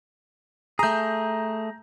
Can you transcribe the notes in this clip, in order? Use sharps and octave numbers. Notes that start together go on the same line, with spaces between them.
A3 G#4 A#5 G6